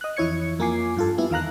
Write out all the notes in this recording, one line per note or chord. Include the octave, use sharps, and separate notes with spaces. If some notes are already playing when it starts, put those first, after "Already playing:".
D#5 F#6
F2 E3 E4 C#5 G#6 C#7
F2 A#3 F4 G#5 D6 C7
G2 F4 A4
G3 B3 E4
E2 D#3 F5 A#5 F#6